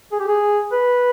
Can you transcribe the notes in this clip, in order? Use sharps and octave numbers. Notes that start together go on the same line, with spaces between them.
G#4
G4
G#4
B4